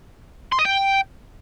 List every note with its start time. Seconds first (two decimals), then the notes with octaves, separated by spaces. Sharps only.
0.52 C6
0.59 D#5
0.65 G5